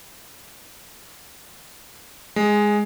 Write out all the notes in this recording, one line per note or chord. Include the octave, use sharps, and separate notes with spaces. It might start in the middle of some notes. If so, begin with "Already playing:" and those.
G#3